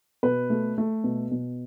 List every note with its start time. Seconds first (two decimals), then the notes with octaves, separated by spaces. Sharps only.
0.23 B2 B4
0.50 A3
0.78 A3
1.04 B2
1.31 B2